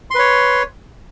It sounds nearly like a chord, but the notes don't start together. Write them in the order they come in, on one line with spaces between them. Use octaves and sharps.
C6 B4 C#5